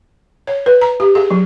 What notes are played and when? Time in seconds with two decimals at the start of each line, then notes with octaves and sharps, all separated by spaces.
0.47 C#5
0.66 B4
0.81 A#5
1.00 G4
1.15 G#4
1.30 F#3